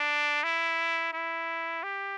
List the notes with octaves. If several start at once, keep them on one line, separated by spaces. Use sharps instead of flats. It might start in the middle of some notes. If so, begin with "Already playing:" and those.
Already playing: D4
E4
E4
G4